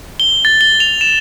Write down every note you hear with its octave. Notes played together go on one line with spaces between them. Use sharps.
G7
A6
G7
F7
E7